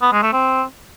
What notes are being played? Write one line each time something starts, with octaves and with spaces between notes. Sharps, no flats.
B3
G#3
A3
C4